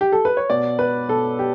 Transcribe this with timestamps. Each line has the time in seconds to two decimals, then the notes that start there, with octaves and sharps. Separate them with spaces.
0.01 G4
0.12 A4
0.25 B4
0.37 C#5
0.50 B2 D5
0.79 B4
1.08 B2 A4
1.39 G4